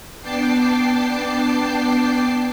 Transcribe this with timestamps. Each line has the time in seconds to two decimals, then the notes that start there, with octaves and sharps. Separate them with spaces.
0.21 B3 D4 G5 A5 D6 C7